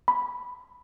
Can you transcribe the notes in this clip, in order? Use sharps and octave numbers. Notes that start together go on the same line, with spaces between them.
B5